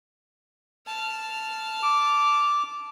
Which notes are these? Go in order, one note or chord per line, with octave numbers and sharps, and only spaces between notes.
A5 F6
D6